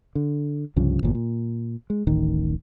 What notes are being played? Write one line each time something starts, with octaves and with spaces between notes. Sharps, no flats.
D3
C2 G2 C#3 F3
G1 E2 A#2
A#2
G#3
D1 A1 D#3